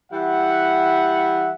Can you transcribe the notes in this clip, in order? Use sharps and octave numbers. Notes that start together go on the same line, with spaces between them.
E3 G3 E5 F#5